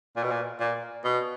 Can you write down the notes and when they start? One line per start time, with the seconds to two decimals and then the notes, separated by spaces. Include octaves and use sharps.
0.16 A#2
0.23 B2
0.31 A#2
0.60 A#2
1.04 B2